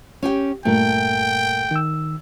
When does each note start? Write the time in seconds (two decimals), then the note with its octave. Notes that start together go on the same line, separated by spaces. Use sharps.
0.23 C#4 G4 G5
0.65 G2 A#2 A3 A#4 G5
1.71 D#3 E6